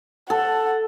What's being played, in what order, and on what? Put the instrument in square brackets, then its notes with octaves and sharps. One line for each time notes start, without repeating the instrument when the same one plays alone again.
[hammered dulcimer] A4 [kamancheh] F#5